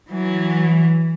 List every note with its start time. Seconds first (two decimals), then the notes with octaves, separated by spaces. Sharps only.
0.11 E3 F#3